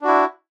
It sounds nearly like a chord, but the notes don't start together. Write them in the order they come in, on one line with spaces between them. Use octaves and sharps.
D4 F#4 E4